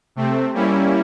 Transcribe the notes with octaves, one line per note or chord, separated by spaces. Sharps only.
C3 A3 C4
G3 A#3 C#4 E4